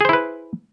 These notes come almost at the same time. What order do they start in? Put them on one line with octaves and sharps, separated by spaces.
G#4 C5 E4 B4